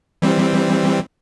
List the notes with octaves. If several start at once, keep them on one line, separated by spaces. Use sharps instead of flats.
E3 G3 C4